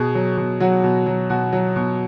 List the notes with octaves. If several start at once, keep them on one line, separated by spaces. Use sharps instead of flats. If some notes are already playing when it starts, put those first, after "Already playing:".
Already playing: B2 G#4
F#3
B2
F#3 F#4
B2
F#3
B2 F#4
F#3
B2